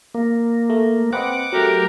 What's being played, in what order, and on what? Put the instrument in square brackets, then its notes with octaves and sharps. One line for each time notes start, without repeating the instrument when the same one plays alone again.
[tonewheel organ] A#3
[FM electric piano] A3
[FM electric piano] C4 B4 D#5 [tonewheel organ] F#5 D6
[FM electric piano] F#3 A3 [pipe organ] G4 A#4